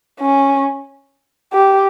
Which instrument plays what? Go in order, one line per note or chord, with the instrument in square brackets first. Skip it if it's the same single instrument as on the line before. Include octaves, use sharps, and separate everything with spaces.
[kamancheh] C#4
G4